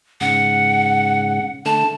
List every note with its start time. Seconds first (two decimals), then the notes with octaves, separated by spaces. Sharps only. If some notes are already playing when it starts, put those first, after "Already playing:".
0.21 G#2 C#3 F#5
1.66 D3 A3 A5